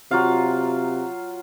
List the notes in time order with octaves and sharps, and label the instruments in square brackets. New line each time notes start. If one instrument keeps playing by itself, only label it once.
[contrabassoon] C3 [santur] F#3 F4 F5